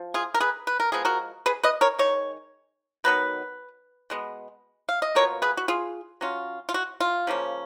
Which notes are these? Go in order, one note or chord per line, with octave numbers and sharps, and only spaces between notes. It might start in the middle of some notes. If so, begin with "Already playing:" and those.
Already playing: F3
F4 G#4
A#4
G#4 B4
B4
A#4
F3 G#3 B3 G#4
F#4 A#4
G#4 B4
B4 D#5
A#4 C#5
D#3 G#3 C#5
D#3 F#3 B3 B4
B2 G#3 B3
F5
D#5
B2 A#3 F4 A#4 C#5
G#4 B4
F#4
F4 G#4
F#3 C#4 F4
F4
F#4
F4
C#3 F3 A#3 C#4